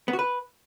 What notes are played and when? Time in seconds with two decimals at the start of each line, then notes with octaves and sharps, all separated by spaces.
0.08 B3
0.13 F#4
0.19 B4